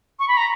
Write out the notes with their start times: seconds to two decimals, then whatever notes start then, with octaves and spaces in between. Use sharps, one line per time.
0.19 C#6
0.28 B5
0.37 A#5